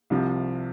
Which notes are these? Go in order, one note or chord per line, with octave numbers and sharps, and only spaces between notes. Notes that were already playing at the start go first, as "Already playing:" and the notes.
C2 C3 F3